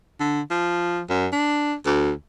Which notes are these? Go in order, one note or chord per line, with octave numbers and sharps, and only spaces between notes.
D3
F3
F#2
D4
D2